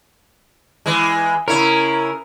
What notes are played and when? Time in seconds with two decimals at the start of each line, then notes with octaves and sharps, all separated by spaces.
0.86 E3 G#3
1.48 C#3 E4 A#4 C#5